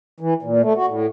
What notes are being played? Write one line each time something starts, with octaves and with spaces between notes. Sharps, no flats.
E3
A#2
A3
F#4
A2